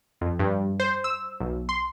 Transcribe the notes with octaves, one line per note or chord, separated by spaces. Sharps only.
F2
G2
C5
E6
B1
C6